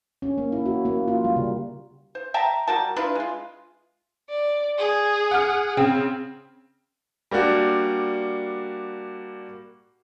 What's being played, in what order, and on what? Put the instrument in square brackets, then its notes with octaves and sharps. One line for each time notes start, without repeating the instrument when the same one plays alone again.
[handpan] C#4
A#3
E4
F#4
A#3
F4
G3
C#3
[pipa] C5
E5 G5 A5 A#5
G3 F#4 A#4 A5
D4 E4 F4 B4
G#3 F4
[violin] D5
G#4
[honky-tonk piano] F#5 F6
C#3 C4
[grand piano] G3 A#3 D4 F#4